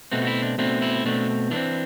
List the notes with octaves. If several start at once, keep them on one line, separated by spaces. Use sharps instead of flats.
B2 A3 C4 F#4
F#4
E4
D4
B2 A3 C4 D4
E4
B2 A3 C4 D4
E3 A3 D4
C4